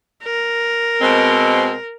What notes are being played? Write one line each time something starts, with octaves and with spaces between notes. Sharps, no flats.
A#4
B2 G#3 C4